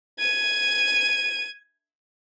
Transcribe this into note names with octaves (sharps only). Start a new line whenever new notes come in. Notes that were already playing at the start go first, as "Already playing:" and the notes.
G#6 D#7